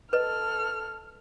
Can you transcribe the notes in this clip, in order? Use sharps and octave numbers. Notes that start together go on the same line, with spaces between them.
A4 B4 D#5 F6